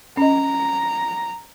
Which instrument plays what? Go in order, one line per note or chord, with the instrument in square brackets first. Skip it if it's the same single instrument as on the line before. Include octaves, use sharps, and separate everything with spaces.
[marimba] C#4 D#5 [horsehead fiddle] A#5